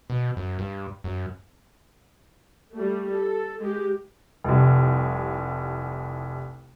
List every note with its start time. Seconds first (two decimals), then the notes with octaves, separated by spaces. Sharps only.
0.10 B2
0.37 F#2
0.59 G2
1.04 F#2
2.73 G3 A3
3.12 A4
3.59 G#3 G4
4.44 F1 C2